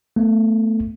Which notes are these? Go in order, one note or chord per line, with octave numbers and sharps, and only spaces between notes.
A3 B3